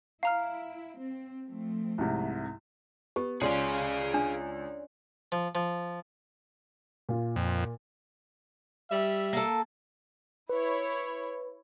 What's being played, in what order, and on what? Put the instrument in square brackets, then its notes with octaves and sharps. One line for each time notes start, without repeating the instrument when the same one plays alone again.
[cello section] E4 [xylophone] F5 A#5 F6
[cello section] C4
F3 A3 C4
[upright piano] C2 G#2 C3
[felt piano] B3 [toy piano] G4
[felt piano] C#2 [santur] C#4 D5 C6 [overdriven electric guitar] G#4 F5
[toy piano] D4
[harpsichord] F3
F3
[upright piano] A#2 F4
[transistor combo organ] F2
[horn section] G3 E5
[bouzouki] A#3 A4
[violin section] E4 C#5 [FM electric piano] B4